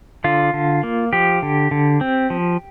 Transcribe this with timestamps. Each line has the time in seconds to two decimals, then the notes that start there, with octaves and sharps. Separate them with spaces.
0.24 D3 F4
0.54 D3
0.83 A#3
1.13 F3 G4
1.43 D3
1.71 D3
2.01 C4
2.30 F3